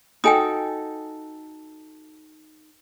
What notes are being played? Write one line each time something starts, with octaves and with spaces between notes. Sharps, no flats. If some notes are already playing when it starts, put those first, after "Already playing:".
D#4 F#4 A4 G5 G#5 D#6